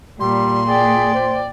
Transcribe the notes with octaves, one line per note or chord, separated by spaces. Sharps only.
A#2 G3 C6
G#4 D5 G5
C5